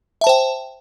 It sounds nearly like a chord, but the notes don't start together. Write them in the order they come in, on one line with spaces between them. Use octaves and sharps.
E5 A5 C5 G5